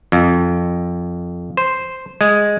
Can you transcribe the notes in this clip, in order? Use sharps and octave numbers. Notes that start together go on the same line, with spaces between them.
F2
C5
G#3